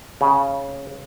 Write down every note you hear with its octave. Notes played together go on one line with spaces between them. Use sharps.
C#3